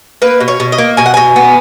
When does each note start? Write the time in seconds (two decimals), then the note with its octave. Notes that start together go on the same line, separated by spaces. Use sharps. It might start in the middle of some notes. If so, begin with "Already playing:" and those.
0.22 A#3 B4
0.40 B2
0.48 C#5
0.60 B2
0.72 D#5
0.78 A#3
0.97 B2 G#5
1.06 F#5
1.14 B2 G#5
1.36 B3